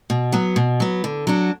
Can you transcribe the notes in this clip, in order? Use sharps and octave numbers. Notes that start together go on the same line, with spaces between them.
B2
F#3 B3
B2
F#3 B3
D3
F#3 D4 F#4